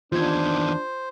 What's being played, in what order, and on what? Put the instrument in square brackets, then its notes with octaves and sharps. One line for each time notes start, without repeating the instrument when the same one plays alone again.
[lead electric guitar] E2 D#3 [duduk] D4 [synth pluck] F4 G#6 [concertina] C5